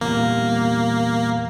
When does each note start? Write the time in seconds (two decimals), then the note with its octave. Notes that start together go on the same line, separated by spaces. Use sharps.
0.01 E2 A#2 G3 A#3